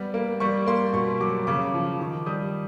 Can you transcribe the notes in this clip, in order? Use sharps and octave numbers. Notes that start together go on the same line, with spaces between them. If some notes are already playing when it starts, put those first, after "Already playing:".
Already playing: G3 B3
A#3
G3 C#6
A#3 C6
B2 C#6
F#3 D6
C#3 D6
F3
D#3 D6
G3 D#6